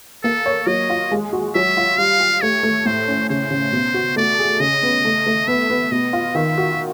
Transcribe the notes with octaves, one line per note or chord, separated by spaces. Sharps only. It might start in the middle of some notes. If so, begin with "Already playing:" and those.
A#3 A4
C#5
F#3 D#5
F4
G#3
F#4
F#3 E5
F4
G3 F5
G4
A3 C#5
A3
A2 C5
C#4
C#3 C5
C#3
B2
F#4
A3 D5
G#4
C#3 D#5
B3
A3
A3
B3 E5
B3
B2 D#5
F4
D#3 E5
F#4